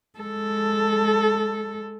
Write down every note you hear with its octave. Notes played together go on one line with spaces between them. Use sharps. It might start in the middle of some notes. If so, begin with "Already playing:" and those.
G#3 A4